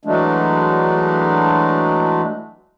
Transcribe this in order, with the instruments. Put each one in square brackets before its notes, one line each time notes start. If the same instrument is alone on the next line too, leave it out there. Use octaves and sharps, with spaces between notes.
[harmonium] E3 F#3 G#3 A3 D4